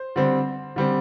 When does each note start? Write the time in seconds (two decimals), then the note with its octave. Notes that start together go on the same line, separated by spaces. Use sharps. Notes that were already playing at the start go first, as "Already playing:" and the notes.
Already playing: C5
0.16 D3 G3 C4
0.76 D3 G3 C4